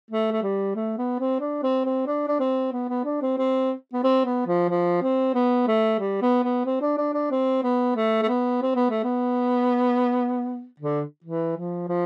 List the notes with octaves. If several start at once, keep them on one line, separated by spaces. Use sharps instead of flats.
A3
A3
G3
A3
B3
C4
D4
C4
C4
D4
D4
C4
B3
B3
D4
C4
C4
B3
C4
B3
F3
F3
C4
B3
A3
G3
B3
B3
C4
D4
D4
D4
C4
B3
A3
A3
B3
C4
B3
A3
B3
D3
E3
F3
F3